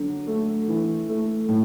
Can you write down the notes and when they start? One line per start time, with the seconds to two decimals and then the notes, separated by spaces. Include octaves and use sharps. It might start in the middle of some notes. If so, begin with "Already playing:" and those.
Already playing: D3 F#3
0.27 A3
0.68 E3
1.09 A3
1.49 A2